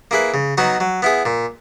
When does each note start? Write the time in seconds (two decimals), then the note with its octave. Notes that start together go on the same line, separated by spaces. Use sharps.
0.11 A#3 E4 G#4 B4
0.34 C#3
0.57 F#3 B3 D#4 F#4
0.80 F#3
1.02 B3 E4 G#4
1.25 A#2